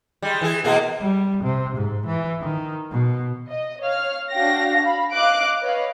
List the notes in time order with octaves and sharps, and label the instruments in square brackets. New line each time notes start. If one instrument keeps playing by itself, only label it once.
[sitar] G3 G#3
E3 G#4
B2 A#3 G#4
[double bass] G3
C3
G#2
E3
D#3
B2
[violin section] D#5
C#5 F5 F6
D4 F#4 F5 G5 A#6
F5 B5
D#5 F5 D6 F#6 D7
B4 C#5 D#5 F5